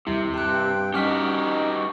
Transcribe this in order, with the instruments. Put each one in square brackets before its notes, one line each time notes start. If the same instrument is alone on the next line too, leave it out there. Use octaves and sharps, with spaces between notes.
[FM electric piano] D#2 G3 E4 [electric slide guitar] C3
[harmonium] G2 G5 [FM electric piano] G4 [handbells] A5 F#6
[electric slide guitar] G2 F#4 G4 [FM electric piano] G3 [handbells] C#4 F6 B6 [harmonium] D#4